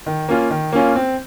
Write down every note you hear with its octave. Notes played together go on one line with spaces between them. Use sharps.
D#3
A#3 C#4 F4
D#3
A#3 C#4 F4
C4